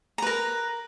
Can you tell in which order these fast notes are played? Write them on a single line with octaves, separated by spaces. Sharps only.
A#5 B4 A#4